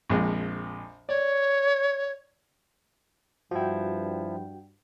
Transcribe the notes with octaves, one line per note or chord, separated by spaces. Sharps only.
A#1 F2 G#3
C#5 D5
G2 F3 E4 F#4 G5